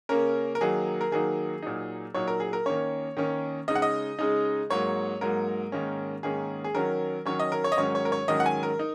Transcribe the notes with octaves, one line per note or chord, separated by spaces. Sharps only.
C#3 A#3 C#4 A#4
A#4
D#3 F#3 A#3 D#4 G#4
A#4
D#3 F#3 A#3 D#4 G#4
A#2 F#3 D#4
A#2 F#3 D#4 C#5
A#4
G#4
A#4
D#3 A#3 C#4 C#5
D#3 A#3 C#4
C#3 G#3 D#4 D#5
F#5
D#5
C#3 G#3 D#4
G#2 F#3 A#3 C#5
G#2 F#3 A#3 A#4
G#2 D#3 A#3 C#4
G#2 D#3 A#3 C#4 G#4
G#4
D#3 F#3 C#4 A#4
D#3 F#3 C#4 C#5
D#5
A#4
C#5
D#5
G#2 D#3 F#3 C#4 C#5
C#5
A#4
C#5
G#2 D#3 F#3 C#4 D#5
F#5
G#5
A#4
D#4